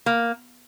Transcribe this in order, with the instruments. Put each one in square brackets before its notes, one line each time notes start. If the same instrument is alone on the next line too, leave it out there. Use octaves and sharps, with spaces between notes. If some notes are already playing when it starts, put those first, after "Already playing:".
[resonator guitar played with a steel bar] A#3